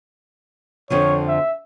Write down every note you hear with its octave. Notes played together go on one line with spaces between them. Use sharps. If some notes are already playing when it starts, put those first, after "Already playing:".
F2 D3 F3 C#5
E5